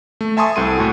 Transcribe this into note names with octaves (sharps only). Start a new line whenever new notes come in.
A3
E5 G#5 A5 C6 C#6 D#6
C2 C4 A4 C6 D#7
A2 F#4